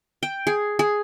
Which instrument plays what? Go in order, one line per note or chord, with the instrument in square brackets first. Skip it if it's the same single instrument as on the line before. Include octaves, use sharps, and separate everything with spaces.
[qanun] G5
G#4
G#4